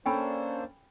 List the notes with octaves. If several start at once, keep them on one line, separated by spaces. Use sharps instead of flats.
A#3 C#4 D4 A4 C5 G5 G#5 B5